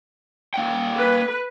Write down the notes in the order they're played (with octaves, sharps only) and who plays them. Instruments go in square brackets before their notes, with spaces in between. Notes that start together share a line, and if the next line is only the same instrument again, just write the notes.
[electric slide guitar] A#3 F#5 G5
[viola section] B4